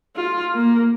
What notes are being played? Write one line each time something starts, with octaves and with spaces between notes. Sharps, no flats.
F4
A#3